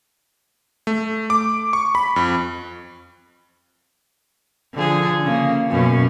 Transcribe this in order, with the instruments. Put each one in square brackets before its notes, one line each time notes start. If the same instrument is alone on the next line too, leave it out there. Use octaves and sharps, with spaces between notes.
[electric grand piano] A3
D6
C#6
B5
F2
[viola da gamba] D3 F3 G#4
C#3 A#3
F#2 B2 C#4